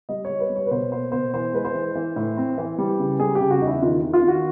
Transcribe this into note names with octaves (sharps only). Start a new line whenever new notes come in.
G3 D#5
C#5
G3
B4
G3
C#5
B4
B2 C5
A#3 C5
B2 C5
E3 C5
G#3 B4
C5
E3
E3
A2
C4
E3
G3
C#3
G3 G#4
G4
C#3
F#4
E2 D#4
E4
D#3 F4
D#3
F4
D#3 F#4